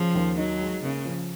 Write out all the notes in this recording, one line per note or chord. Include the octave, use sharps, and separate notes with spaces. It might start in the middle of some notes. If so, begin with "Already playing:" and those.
Already playing: C#3 F3
D#2
F#3 D#4
G#3
C#3 A#3
F3